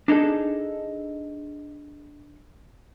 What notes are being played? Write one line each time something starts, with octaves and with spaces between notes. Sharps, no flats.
D4 D#4 G#4 A4